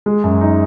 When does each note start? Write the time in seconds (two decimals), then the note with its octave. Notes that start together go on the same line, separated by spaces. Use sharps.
0.06 G#3
0.24 F#2
0.41 D#4